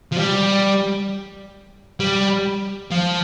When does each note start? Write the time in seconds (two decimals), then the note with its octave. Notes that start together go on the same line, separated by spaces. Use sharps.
0.12 F3
0.17 G3
2.00 G3
2.91 F3